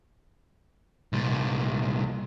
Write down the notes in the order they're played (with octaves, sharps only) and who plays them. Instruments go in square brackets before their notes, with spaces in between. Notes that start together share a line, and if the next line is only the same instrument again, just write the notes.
[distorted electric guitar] C2 A#2